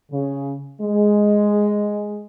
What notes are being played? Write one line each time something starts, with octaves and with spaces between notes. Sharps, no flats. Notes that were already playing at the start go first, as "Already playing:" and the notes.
C#3
G#3